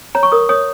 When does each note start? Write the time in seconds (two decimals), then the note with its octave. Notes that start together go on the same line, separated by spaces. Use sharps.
0.15 C#5 A#5
0.23 C#6
0.32 A#4 D#6
0.49 C#5 D#6